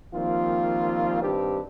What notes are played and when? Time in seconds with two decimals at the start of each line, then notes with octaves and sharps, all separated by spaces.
0.14 D#3 F3 G3 A#3 C4 F4
1.22 G2 D#3 C4 D4 G4